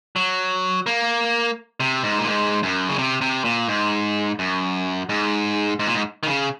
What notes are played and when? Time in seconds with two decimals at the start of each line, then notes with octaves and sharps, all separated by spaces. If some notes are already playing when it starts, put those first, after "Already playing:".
0.16 F#3
0.86 A#3
1.80 C3
2.03 G#2
2.18 A#2
2.27 G#2
2.63 F#2
2.89 C#3
2.98 C3
3.21 C3
3.45 A#2
3.68 G#2
4.39 F#2
5.09 G#2
5.79 G#2
5.87 A#2
5.94 G#2
6.23 D#3
6.26 C#3